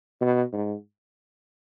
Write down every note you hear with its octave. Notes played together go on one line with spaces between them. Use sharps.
B2
G#2